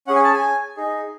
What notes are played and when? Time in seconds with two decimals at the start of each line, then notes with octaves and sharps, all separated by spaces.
0.07 C#4 G#4 F#5
0.16 G#5
0.24 A5
0.33 G#5
0.77 D#4 G#4